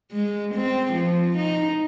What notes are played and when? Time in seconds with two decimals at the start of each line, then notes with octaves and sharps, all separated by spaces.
0.12 G#3
0.54 C4
0.93 F3
1.36 D#4